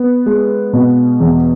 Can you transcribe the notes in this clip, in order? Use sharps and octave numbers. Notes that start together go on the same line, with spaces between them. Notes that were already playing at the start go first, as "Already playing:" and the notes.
Already playing: B3
G#3
B2
E2